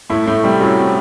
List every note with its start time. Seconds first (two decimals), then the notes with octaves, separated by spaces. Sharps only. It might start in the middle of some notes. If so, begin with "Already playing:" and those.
0.09 A2 A3 E4
0.26 A2 A3 E4
0.44 C3 G3 C4
0.61 F#2 F#3 E4
0.78 C4